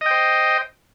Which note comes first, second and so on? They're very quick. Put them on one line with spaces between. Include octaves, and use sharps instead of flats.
D#5 G5 C5